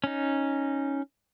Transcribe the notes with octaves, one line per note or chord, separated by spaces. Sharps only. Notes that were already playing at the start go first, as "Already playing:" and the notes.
C#4 D#4